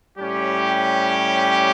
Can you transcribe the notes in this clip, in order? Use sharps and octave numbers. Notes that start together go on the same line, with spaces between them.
A2 G3 C#4 G4